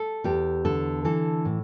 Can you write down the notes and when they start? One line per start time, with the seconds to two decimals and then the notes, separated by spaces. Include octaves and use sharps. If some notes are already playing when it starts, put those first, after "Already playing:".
Already playing: A4
0.24 E2 G4
0.65 D3 A4
1.05 E3 A4
1.45 A2